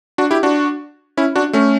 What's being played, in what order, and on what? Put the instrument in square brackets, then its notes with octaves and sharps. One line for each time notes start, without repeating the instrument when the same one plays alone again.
[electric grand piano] D4 F#4
E4 G4
D4 F#4
C#4 E4
D4 F#4
A3 C#4